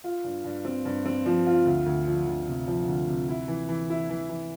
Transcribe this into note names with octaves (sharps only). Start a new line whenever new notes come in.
F4
G2
G2
C4
G2
C4
F3
F4
D2
D2
F3
D2
C3
F3
D2
C3
E4
E3
E3
E4
E3
E3